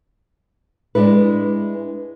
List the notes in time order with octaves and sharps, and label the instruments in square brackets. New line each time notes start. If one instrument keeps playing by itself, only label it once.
[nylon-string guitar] G#3 D4 E4 B4